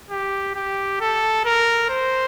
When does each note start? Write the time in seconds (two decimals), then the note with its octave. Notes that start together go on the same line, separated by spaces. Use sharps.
0.10 G4
0.55 G4
1.00 A4
1.45 A#4
1.89 C5